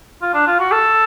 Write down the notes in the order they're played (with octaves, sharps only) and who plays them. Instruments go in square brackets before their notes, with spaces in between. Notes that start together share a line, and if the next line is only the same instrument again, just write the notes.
[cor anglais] F4
D4
F4
F#4
A4